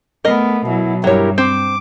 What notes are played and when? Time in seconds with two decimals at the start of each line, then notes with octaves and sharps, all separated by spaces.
0.25 A3 B3 A#4 D#5
0.67 B2 F#3 E4
1.04 G2 F#3 E4 G4 A#4 C#5
1.38 C4 D6